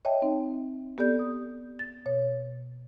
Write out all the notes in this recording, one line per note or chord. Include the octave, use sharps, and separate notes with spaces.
C#5 D#5 E5 G5 A5
C4 D#4
B3 G4 A4 D5 G6
D#6
A6
B2 C#5